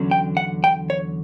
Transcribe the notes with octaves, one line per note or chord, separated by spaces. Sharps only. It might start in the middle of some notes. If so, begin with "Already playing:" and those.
Already playing: E2 D3 F#3 C#4
G5
F#5
G5
C#5